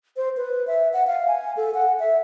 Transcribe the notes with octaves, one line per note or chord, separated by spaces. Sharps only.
C5
B4
E5
F#5
F5
G#5
A4
F#5
E5